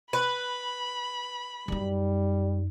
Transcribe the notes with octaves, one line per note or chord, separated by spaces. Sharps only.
B4 B5
F#2 G3 D#4